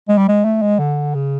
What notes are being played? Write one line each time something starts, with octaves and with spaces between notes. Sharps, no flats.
G#3
G3
G#3
A3
G#3
D3
C#3